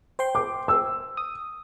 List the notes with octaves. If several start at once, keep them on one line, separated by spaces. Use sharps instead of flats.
C5 G5 C6
D6
E6
D#6